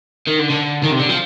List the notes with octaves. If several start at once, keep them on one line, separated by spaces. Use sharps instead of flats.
D#3
D3
D3
D#3
C3
D3
F3